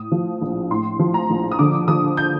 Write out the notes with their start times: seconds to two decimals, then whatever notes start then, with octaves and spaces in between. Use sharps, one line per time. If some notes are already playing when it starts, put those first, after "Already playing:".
Already playing: A2 D#6
0.12 F3
0.42 A#1
0.70 A2 C6
0.99 F3
1.14 A#5
1.30 A#1
1.52 D#6
1.59 D3 D6
1.88 F3 D#6
2.17 G6